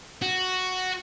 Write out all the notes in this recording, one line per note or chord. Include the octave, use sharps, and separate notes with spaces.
F#4